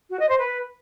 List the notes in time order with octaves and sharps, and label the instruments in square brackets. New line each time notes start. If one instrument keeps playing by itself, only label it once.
[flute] F#4
D#5
C5
B4